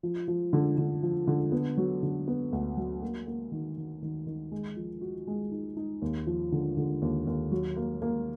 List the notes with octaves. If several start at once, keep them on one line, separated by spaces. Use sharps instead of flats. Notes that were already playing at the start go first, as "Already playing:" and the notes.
F3
F3
D3
D3
F3
D3
B3
F#3
D3
B3
D2
F#3
A#3
A#3
D#3
D#3
D#3
D#3
G#3
F3
F#4
G#3
D#4
D#4
D#2
F3
D3
D3
D#2
D#2
F#3
A#3
A#3